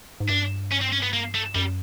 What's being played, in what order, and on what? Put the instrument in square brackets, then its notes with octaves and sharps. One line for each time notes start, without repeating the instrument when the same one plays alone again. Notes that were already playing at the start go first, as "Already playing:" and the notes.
[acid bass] G#2
[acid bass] G2 [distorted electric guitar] D4
[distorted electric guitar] C#4
C4
C#4
B3
A#3
A3
[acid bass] F#2 [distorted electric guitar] G3